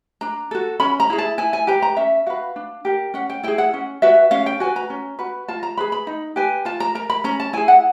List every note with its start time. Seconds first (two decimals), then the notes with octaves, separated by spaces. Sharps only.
0.21 D4 A#5
0.51 F#4 A4
0.80 C#4 B5
1.00 A#5
1.10 E4 G#4
1.18 A5
1.38 E4 G#5
1.53 G#5
1.67 G4 B4 A#5
1.82 A#5
1.97 C#4 E5
2.26 F#4 B4 F5
2.56 D4
2.85 G4 A#4
3.14 C#4 F#5
3.30 G5
3.43 E4 G#4 G5
3.58 F#5
3.73 C#4
4.02 F#4 B4 E5
4.31 C#4 F5
4.46 G5
4.60 F#4 B4 G#5
4.76 A#5
4.90 C#4
5.19 F#4 B4
5.48 F4 A5
5.63 A#5
5.77 G#4 B4 B5
5.92 B5
6.07 D#4
6.36 G4 B4 G#5
6.65 F4 A5
6.80 A#5
6.95 A#4 A#5
7.10 B5
7.24 C#4 A#5
7.40 A5
7.53 E4 G#4 G#5
7.68 F#5